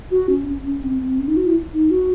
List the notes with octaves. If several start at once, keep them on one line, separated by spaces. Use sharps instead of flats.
F#4
C#4
C#4
C#4
C4
C4
C#4
D#4
F#4
E4
D#4
F#4